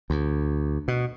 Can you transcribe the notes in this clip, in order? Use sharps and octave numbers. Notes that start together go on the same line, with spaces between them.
D2
B2